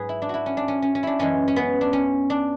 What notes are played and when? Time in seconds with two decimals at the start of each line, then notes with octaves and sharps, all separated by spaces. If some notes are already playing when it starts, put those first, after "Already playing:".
Already playing: G#2 F#3 G#4 B4
0.09 E4
0.22 D4
0.29 E4 F#4
0.46 C#4
0.57 D4
0.68 C#4
0.82 C#4
0.95 C#4
1.03 D4 E4
1.19 F#2 E3 G#3 C#4
1.48 C#4
1.56 B3
1.81 D4
1.93 C#4
2.30 D4